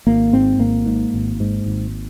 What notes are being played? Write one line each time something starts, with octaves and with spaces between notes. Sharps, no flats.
G#1 A#3
G#2 C4
G#1 A#3
G#2
G#1
G#2
G#1